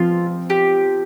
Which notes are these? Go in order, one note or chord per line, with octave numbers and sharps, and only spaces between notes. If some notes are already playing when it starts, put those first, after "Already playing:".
Already playing: F3 C4 F4
G4